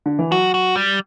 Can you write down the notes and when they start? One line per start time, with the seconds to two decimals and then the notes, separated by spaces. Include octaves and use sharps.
0.06 D3
0.19 E3
0.31 F#3 F#4
0.54 F#4
0.76 G3